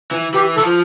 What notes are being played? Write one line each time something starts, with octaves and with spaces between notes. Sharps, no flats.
E3
E3 G4
E3 A4
F3